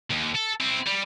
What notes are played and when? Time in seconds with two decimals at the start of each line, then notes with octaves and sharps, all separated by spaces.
0.10 D#2
0.35 A4
0.60 C4 E4
0.87 G3